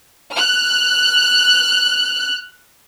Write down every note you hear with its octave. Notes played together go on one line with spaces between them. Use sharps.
F6 F#6